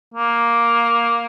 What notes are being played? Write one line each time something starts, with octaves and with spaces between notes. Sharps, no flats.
A#3